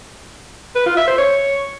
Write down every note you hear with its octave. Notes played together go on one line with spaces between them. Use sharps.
B4
F4
E5
C5
C#5